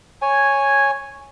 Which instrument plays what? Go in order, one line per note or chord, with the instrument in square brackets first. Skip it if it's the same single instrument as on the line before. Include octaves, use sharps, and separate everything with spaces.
[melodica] C#5 G#5